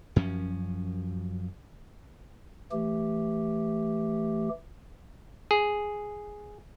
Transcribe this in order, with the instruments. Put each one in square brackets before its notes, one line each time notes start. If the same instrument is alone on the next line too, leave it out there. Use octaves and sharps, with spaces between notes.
[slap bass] F#2 F3 C#4
[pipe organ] E3 A3 G4
[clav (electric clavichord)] G#4